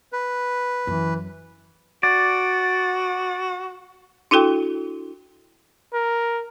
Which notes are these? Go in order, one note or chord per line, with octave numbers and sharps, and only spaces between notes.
B4
F#2 E3
F#4 D5
D4 E4 F#4 A4 G5
A#4